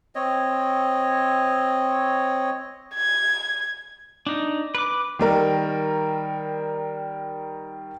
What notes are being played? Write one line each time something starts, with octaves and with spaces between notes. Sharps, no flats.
C4 C#5 D#5
G#6
D4 D#4
B4 D6
D#3 G3 A#4